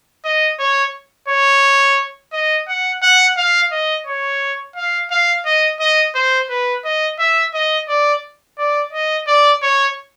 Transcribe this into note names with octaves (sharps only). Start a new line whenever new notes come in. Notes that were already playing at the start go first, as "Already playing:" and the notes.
D#5
C#5
C#5
D#5
F#5
F#5
F5
D#5
C#5
F5
F5
D#5
D#5
C5
B4
D#5
E5
D#5
D5
D5
D#5
D5
C#5